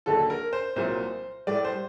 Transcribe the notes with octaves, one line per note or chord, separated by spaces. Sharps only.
D#2 D3 F#3 A4
A#4
C5
C2 A#2 F#3 C5
A2 G3 D5
C5